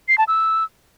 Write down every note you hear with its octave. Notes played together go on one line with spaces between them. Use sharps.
C7
A5
E6